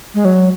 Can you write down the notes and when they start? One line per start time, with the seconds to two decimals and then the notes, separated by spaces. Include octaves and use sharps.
0.14 G#3
0.25 F#3